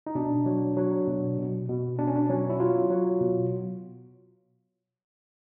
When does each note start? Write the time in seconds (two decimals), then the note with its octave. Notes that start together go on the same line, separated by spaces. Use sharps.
0.07 D#4
0.15 B2 D4
0.46 F#3
0.77 F#3
1.07 B2
1.38 B2
1.69 B2
1.99 B2 D4
2.07 C#4
2.16 D4
2.29 F#3 C#4
2.50 E4
2.60 F#3 F4
2.90 F#3
3.21 B2